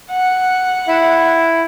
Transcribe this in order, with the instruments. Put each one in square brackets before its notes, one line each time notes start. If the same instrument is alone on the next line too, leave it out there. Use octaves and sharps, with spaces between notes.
[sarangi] F#5
[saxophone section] E4